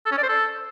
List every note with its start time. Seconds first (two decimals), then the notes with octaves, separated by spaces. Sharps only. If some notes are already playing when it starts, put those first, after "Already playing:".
0.06 A4
0.12 C#4
0.17 D5
0.23 C5
0.29 A4